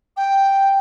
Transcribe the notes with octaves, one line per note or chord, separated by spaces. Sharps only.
G5